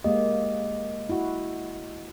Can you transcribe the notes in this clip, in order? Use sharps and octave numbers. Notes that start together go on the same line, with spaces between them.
G#3 A#3 G4 D#5
E4 F#4